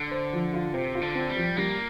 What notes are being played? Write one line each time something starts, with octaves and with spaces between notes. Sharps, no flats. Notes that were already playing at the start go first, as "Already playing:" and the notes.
Already playing: D3
C5
F3
F4
C3 C5
F4
D3
C4
G3
F3
G3 A#3